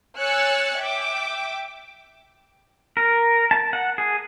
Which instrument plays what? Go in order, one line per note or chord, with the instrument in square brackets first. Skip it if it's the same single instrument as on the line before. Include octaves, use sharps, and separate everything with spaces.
[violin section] C#5 G#5 E6 F#6 A6 C#7
E5 G5 D6
[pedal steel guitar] A#4
A5
F#5
G#4